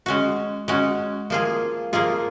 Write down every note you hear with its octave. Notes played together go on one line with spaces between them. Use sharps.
G#3 C#4 F#4
G#3 C#4 F#4
F3 A#3 F4 G#4
F3 A#3 F4 G#4